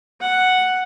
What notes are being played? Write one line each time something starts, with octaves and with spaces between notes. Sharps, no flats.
F#5